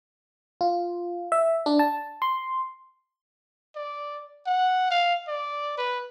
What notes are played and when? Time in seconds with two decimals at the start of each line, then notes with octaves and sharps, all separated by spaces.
0.61 F4
1.32 E5
1.66 D4
1.79 A5
2.22 C6
3.76 D5
4.46 F#5
4.91 F5
5.28 D5
5.78 B4